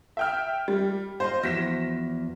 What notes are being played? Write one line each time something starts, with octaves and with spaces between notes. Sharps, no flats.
E5 G5 F6
G3
F4 C5 D#5 F5
E2 F3 F#4 A#6 B6 E7